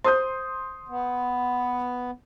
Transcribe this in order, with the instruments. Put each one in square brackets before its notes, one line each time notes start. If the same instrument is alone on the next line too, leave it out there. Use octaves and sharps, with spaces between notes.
[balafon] C5 [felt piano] C6 D#6 G6
[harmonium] B3